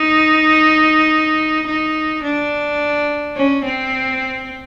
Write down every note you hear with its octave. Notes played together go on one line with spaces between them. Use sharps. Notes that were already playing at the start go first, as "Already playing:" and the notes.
Already playing: D#4
D#4
D4
C#4
C4